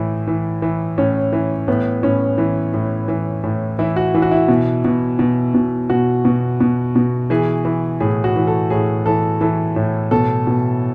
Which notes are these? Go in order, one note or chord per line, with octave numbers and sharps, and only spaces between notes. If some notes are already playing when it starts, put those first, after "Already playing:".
Already playing: A2 E3
E3
E3
A2 C#4
E3
A2 B3
A2 C#4
E3
A2
E3
A2
E3 E4
F#4
E3
F#4
E4
B2
B2
B2
B2
B2 F#4
B2
B2
B2
E3 G#4
E3
A2 G#4
F#4
E3
A4
A2 G#4
E3 A4
E3 A4
A2
B2 A4
B2